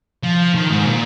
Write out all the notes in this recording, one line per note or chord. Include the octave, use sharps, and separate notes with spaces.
F3
D#3
G#2
A#2